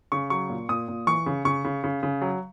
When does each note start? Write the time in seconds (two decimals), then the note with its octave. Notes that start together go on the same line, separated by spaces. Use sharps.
0.12 C#3 C#6
0.30 F#3 C#6
0.49 A#2
0.69 A#2 D#6
0.88 A#2
1.07 E3 C#6
1.26 C#3
1.45 C#3 C#6
1.64 C#3
1.84 C#3
2.03 C#3
2.21 F#3